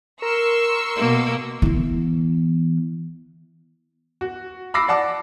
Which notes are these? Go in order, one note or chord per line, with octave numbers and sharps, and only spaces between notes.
A#4 C6 C#6 E6
B2 A#3
E3 B3
F#4
B5 D6 E6 A#6 C7
D5 F#5 A5 D6